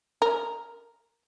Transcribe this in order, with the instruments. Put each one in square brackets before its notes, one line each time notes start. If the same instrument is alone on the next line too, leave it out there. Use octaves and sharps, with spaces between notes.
[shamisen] A#4